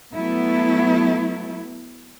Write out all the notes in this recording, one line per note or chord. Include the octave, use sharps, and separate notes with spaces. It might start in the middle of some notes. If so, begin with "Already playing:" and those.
F#3 A3 B3 E4